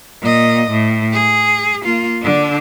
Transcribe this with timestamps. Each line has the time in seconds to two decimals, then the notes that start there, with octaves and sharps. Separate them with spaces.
0.21 A#2 D#5
0.71 A2
1.13 G#4
1.85 A#3 F4
2.22 D3 D4